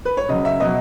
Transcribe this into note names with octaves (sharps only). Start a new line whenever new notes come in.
B4
C#5
C#3 F#3 D#5
E5
B2 F#3 D#5